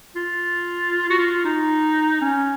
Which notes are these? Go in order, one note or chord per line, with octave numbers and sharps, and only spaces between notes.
F4
F#4
F4
D#4
C#4